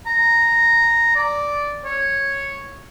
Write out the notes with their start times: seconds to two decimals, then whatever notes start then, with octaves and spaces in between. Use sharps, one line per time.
0.07 A#5
1.16 D5
1.85 C#5